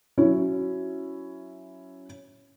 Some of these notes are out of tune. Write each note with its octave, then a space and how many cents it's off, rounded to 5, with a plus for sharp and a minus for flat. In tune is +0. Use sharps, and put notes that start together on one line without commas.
F#3 +0 C#4 +0 E4 +0